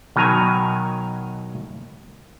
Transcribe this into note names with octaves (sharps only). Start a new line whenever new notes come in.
B2 D#3 F#3 G#5 A#5